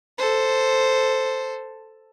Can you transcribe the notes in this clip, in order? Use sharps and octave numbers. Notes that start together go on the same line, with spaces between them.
A4 C5